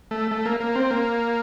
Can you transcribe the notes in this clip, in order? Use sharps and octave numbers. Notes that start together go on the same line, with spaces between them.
A3
A3
A#3
A#3
C4
A#3